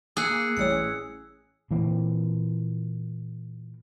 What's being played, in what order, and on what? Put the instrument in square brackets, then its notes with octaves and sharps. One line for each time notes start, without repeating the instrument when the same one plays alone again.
[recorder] A#3 [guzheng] G#4 [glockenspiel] E6 F#6 C#7
[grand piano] A1 C#5 [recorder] G3 [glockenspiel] E6 C#7
[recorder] C#4
[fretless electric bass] A#2 E3 A#3 C4